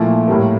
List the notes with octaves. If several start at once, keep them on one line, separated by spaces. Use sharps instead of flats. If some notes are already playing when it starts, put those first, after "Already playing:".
Already playing: A#2 F3 A3 E4
A2 G3 A#3